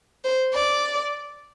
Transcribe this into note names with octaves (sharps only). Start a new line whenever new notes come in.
C5
D5